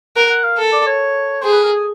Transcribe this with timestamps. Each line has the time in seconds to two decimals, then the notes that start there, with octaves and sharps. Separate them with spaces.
0.16 A#4 F#5
0.30 F#5
0.44 F5
0.58 A4
0.72 D5
0.87 C#5
1.42 G#4 C5
1.52 B4
1.63 A#4
1.74 G#4